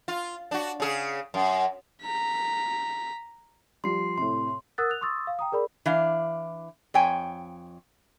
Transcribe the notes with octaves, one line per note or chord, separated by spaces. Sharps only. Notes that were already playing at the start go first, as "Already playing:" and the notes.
F4
D4 F#4
C#3 G#4
F#2
A#5 B6
F3 G3 C6 C7
A2 C3 C6
A#4 F#5 D#6 E6 F#6 A6
F#6 F7
C6 C#6 D#6 E6 A6
F5
G5 A#5 D#6
G#4 A#4 D5 B5
E3 D4 F5
F2 C#5 G5 G#5